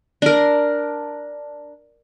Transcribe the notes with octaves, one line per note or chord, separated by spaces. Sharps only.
D4 A#4